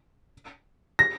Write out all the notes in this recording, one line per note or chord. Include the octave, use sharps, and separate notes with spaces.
A#6